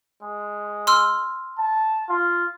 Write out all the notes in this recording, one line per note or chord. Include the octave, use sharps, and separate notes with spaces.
G#3
C6 E6 F6
A5
F4